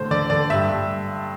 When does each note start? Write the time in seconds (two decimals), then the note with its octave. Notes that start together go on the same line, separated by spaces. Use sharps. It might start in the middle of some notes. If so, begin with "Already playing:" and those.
Already playing: A2 D3 C5
0.11 D3 D5
0.30 D3 D5
0.50 G2 E5
0.70 G2